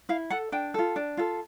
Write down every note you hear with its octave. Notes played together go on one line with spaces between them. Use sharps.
E4 F5
A4 F#5
D4 G5
F4 A4
D4
F4 A4